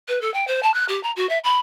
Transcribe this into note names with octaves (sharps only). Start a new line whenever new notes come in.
B4
A4
G5
C5
A5
F#6
G4
A#5
F#4
E5
B5